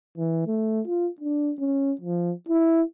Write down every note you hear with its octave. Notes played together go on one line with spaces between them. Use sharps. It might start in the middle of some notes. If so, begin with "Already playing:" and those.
E3
A3
F4
D4
C#4
F3
E4